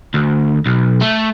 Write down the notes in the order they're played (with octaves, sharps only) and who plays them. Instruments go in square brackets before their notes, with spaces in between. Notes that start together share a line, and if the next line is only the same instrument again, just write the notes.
[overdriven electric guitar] D2
B1
A3